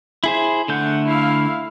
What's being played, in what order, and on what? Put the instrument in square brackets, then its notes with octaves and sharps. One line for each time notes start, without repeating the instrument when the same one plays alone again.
[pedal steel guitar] E4 G#4 C5
[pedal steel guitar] D3 A3 G6 [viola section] F#5
[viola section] E4 F5